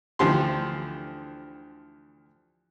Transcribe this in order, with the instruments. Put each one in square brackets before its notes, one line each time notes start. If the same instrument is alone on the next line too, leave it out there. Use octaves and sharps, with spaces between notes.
[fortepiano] D2 E3 F3 G4 C6